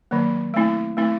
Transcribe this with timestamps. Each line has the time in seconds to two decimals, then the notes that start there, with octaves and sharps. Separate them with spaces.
0.11 D#3 F#3 A#3
0.54 A3 C4 E4
0.97 A3 C4 E4